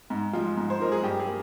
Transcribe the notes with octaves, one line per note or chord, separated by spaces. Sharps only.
G#2
F3 G#3 F4
G#2
C5
F3 G#3 A#4
G#4
G2 G4
G#4
A#3